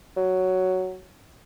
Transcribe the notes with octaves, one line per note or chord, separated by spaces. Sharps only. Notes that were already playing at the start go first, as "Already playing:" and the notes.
F#3